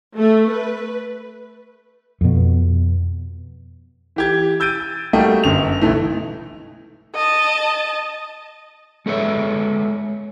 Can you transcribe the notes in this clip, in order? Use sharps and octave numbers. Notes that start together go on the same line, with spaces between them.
A3
B4
F2 B2
E3 G4 G#6
E6 G6 A6 D7 D#7
G3 A3 A#3 F#4 D#5 G5
G1 F#2 F7
B1 E3 A3 D#4 E4
D#5 A5
G#3 A4 B4 C#5 E5